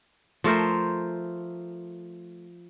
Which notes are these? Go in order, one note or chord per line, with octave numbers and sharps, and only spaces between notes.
F3 A3 A#4 C5